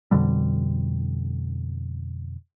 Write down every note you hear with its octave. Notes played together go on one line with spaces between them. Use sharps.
F2 B2 D3 G3